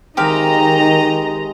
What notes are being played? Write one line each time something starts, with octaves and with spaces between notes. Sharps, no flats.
C3 D#3 G#3 D#4 G4 D#5 F5 A#5